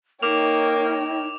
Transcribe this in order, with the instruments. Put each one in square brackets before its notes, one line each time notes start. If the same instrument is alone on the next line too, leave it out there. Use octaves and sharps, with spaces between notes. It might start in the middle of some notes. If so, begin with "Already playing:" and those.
[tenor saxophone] A#3 [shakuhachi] D#4 [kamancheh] C#5 G5 [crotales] D6 F7